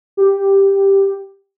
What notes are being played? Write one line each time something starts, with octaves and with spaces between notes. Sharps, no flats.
G4